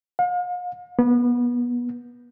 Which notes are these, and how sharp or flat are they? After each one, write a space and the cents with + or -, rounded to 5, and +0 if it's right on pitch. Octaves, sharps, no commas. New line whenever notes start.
F5 +40
B3 -25